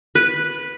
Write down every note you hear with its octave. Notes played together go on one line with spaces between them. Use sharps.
B4